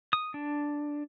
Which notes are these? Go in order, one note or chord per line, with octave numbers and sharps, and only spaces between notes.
D#6
D4